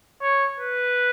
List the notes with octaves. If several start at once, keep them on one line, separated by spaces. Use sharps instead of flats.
C#5
B4